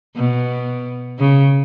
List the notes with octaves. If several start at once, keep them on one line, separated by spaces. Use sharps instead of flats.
B2
C#3